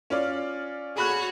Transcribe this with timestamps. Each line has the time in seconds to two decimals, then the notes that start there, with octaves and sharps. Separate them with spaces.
0.10 C#4 F4 D5
0.96 F#4 G#4 C#5 B5 F#6